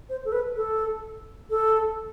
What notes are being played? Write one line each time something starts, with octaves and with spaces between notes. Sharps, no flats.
C5
A4
B4
A4
A4